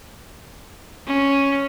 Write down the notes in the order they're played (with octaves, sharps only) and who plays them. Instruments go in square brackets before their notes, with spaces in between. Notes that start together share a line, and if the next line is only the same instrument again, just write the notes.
[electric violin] C#4